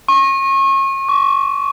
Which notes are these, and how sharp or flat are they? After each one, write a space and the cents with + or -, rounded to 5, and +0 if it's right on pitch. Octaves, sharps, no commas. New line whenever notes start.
C#6 -35
C#6 +40